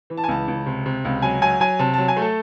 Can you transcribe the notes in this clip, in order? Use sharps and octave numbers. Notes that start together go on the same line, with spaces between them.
E3
A5
G#5
C#2 A5
C#2
C3
C3
C#2
F#3 G#5
F#3 G#5
F#3 G#5
C3 A5
F#3 A5
G#5
A3
A4